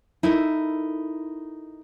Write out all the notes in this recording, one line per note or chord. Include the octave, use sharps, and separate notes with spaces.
D#4 E4 A4 A#4